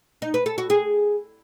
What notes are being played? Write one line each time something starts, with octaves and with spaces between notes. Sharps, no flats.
D#4
B4
A4
F#4
G#4